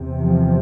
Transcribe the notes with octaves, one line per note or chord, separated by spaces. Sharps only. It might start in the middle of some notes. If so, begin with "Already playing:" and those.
Already playing: E2 C3
F3